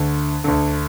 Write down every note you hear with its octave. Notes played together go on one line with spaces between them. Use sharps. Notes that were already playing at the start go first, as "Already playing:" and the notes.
Already playing: D2 D3
D2 D3